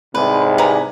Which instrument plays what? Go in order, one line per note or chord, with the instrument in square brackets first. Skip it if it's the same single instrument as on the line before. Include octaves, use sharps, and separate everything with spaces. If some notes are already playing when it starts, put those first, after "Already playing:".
[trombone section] C2 G#2 C3 [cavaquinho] B4
[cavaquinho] B4 G#5 A#5